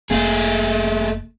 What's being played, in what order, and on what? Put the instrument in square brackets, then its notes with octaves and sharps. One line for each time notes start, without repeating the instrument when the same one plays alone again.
[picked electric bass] F1 A#3 [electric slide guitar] A3 G#4